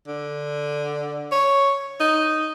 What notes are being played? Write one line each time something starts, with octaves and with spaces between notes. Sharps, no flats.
D3
C#5
D#4